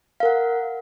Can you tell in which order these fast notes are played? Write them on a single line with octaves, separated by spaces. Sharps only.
F5 A#4 F#5